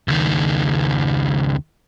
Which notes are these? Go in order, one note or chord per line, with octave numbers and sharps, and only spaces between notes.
C#2 D#3